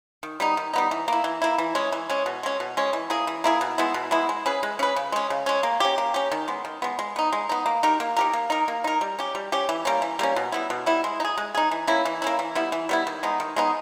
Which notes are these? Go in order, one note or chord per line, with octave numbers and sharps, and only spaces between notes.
D#3
G3 B3 D#4
D#3
G3 B3 D#4
E3
A#3 E4
E3
A#3 E4
E3
G#3 C#4
E3
G#3 C#4
B2
G#3 C#4
B2
G#3 C#4
E3
A#3 E4 G#4
E3
A#3 E4 G#4
B2
G#3 B3 E4
B2
G#3 B3 E4
G#3
C#4 G#4 B4
G#3
C#4 G#4 B4
C#3
G#3 C#4
C#3
G#3 C#4
A#3
C#4 G4
A#3
C#4 G4
D#3
G#3 B3
D#3
G#3 B3
G#3
B3 D#4
G#3
B3 D#4
A#3
D#4 G4 A#4
A#3
D#4 G4 A#4
A#3
D#4 A#4
A#3
D#4 A#4
G3
C#4 G4
G3
C#4 G4
E3
G3 A#3 C#4
E3
G3 A#3 C#4
B2
G3 B3 E4
B2
G3 B3 E4
G#3
D#4
G#4
G#3
D#4 G#4
E3
A#3 C#4 E4
E3
A#3 C#4 E4
E3
G3 B3 E4
E3
G3 B3 E4
D#3
G#3 B3 D#4
D#3
G#3 B3 D#4